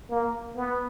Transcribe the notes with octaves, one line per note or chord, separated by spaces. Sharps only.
A#3
B3